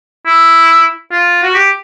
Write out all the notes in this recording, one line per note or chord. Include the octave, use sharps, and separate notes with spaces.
E4
F4
F#4
G4